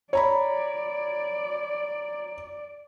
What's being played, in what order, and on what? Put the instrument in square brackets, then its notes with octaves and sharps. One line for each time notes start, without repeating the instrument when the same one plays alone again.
[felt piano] C#5 A#5 B5 [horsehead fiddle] D5